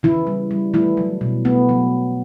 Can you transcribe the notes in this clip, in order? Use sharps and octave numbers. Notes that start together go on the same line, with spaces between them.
C#3 E3 E4
G3
G3
E3 A3 E4
F#3
B2
A3 B3
F#3